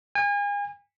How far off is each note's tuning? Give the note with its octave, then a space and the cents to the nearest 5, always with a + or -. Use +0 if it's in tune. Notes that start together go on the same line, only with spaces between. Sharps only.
G#5 -35